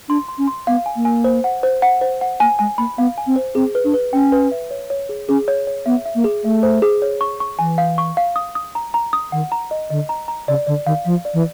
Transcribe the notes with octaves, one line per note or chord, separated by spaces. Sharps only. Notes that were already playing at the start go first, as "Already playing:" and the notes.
D4 C6
C6
C#4
C6
B3 F5
G#5
A#3
G#5
C5
F#5
C5
F#5
C5
F#5
A#3 G#5
G#3 G#5
A#3 B5
B3 F5
G#5
C4
C5
C4 G#4
B4
D4
B4
C#4 G5
B4
E5
C#5
C#5
G#4
C#4 G#4
C#5
C#5
B3 E5
E5
A#3
G#4
A3 E5
C5
G#4
C#5
C#6
C#6
E3 G#5
F5
C#6
F5
D#6
D#6
A#5
A#5
D#6
D#3 F#5
A#5
D#5
D3 D#5
A#5
A#5
C#3 D5
D3 D5
D#3 F5
F3 F5
D5
E3